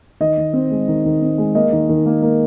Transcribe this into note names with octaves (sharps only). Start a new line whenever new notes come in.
D#3 D#5
D#3
C4
G#3
D#3
D#3
C4
G#3
A#3 D#5
D#3
D#3
A#3
A#3